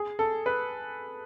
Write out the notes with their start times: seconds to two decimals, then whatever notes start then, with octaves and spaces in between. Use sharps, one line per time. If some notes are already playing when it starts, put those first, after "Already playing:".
Already playing: G#4
0.19 A4
0.46 B4